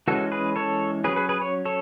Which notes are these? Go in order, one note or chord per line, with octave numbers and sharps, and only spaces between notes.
E3 G#3 C#4 F#4 A4
G#4 B4
A4 C#5
F#3 C#4 G#4 B4
G#4 B4
G#4 B4
C#5
A4 C#5